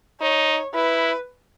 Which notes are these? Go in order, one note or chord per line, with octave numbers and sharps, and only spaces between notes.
D#4 C#5
E4 B4